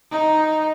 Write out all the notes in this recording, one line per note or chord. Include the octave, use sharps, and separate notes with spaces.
D#4